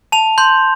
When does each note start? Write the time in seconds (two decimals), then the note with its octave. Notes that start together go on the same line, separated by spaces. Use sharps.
0.12 A5 F7
0.38 C6 G6